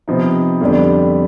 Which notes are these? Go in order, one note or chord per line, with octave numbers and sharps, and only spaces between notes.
C3 F3 B3 D#4
F2 D3 G3 B3 D4